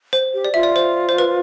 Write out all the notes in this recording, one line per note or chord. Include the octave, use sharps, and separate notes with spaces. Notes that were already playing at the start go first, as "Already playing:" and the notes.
C5
G4
D5
F4 E5
D5
C5
C5
B4